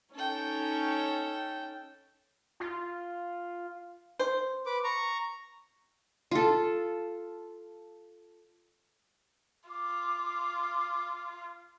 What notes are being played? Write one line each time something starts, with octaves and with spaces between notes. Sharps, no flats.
C#4 D#4 A4 C#5 G5
F4
C5
B4 D6
A#5 C#6
F4 A4
F4 D6